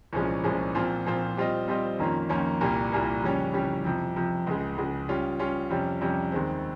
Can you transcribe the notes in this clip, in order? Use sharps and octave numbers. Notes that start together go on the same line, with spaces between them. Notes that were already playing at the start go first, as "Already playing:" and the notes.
C2 A#2 F3 G#3 C#4
C2 A#2 F3 G#3 C#4
A#2 F3 C4 F4 C5
A#2 F3 C4 F4 C5
G3 C4 F4 C5 D#5
G3 C4 F4 C5 D#5
F2 D#3 A#3 C#4 F4
F2 D#3 A#3 C#4 F4
C2 A#2 G3 A#3
C2 A#2 G3 A#3
F2 C#3 G3 C#4
F2 C#3 G3 C#4
F2 C3 F3
F2 C3 F3
C#2 C#3 G#3
C#2 C#3 G#3
G3 C#4 F4
G3 C#4 F4
F2 C3 G3 C#4
F2 C3 G3 C#4
D#2 D#3 G#3 C4